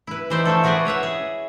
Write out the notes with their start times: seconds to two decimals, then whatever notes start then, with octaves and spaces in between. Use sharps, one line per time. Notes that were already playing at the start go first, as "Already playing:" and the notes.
0.07 E4 B4
0.30 E3 D#4 C5 D5 E5
0.45 E3 F3 A3 A4
0.64 E4 F#4 G#4 B4 C5 D5
0.85 B4 C#5 E5 F#5
1.03 G#4